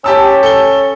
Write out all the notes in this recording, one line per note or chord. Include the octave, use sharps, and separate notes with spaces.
C#4 G4 A5 E6
A4 G7